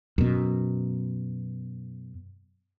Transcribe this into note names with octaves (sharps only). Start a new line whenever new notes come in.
F#2 B2